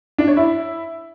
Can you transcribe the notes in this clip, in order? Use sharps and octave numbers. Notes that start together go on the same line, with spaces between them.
D4
C#5
E4